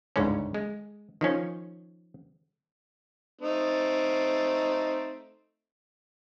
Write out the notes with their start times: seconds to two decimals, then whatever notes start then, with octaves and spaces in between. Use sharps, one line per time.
0.16 G1 C#2 G#2 D3 C#4
0.54 G#3
1.21 D#3 F3 C#4
3.40 A3 C4 D#4